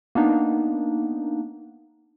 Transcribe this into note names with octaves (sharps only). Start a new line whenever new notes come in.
A#3 B3 D4 D#4